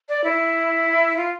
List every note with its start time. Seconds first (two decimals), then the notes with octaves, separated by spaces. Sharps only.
0.09 D5
0.24 E4
1.17 F4